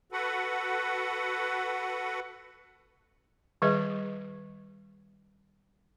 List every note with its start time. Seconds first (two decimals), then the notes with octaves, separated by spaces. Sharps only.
0.12 F#4 A4 B4 F#5
3.62 D#3 G3 G#4 B4 D#5